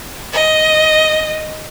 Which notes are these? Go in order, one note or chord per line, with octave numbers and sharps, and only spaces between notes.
D#5